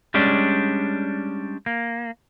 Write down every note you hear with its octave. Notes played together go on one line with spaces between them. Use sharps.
G3 G#3 C#4 D4
A#3